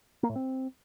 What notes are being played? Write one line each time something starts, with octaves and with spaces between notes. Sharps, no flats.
A#3
A2
C4